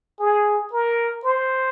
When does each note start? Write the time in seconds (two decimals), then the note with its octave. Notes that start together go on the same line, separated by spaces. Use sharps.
0.20 G#4
0.73 A#4
1.25 C5